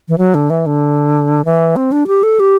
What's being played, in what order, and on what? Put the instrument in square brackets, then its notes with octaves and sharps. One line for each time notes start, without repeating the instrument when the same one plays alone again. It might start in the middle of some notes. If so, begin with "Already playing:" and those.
[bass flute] E3
F#3
D3
E3
D3
E3
C4
D4
G4
A4
G4